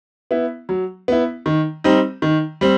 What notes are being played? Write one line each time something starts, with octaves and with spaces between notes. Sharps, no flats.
B3 E4
F#3
B3 E4
D#3
G3 C4 D#4
D#3
G3 C4